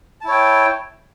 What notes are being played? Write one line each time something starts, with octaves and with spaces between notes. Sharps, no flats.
E4 C#5 G5 A5